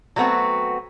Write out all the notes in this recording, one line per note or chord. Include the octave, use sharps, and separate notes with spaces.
F#3 G3 A3 B3 C4 F#4